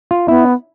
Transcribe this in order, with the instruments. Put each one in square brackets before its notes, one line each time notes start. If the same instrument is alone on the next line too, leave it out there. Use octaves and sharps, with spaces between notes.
[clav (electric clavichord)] F4
[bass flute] B3 [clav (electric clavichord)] E4